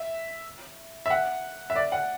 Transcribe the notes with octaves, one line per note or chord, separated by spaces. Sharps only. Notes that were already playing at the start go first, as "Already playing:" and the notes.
Already playing: E5
E5
F#5
E5
D5
F#5